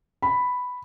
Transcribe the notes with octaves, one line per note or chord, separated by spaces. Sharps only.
B5